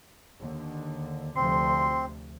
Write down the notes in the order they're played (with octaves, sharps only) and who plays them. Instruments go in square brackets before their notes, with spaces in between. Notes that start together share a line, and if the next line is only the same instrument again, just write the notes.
[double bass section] D#2 D3
[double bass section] D2 C3 F3 [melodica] C4 [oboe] C6